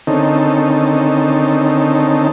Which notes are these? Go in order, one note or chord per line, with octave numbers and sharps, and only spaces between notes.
D3 D#3 C4 C#4 D#4 A4